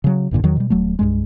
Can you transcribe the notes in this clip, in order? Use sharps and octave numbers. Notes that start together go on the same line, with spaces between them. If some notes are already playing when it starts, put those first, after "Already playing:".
C#3 F#3
A#1 G2 A#2 D3
E2 D#3 F#3
B2 G3
D#1 F#3 A3
C2 G2 G#3